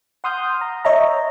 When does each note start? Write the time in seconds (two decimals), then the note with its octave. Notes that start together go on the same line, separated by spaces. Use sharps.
0.24 F#5 C6 D#6 F6 G6
0.61 A#5
0.85 C#5 D#5 E5 A#5